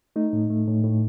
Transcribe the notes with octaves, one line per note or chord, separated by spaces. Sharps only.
A3 D#4
A2
A3
A2
A2